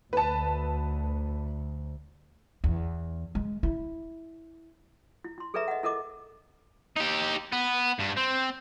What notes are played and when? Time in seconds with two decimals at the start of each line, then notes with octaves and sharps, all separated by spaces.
0.13 D2 B4 A5
2.64 E2
3.35 G#3
3.63 E4
5.24 E4
5.38 E4 C6
5.54 G#4 A4 B4 D5 E5 A#5
5.68 D#5 F#5
5.83 E4 A4 A#4 D#5 D6
6.96 D#4 G4
7.53 B3
8.00 G2
8.17 C4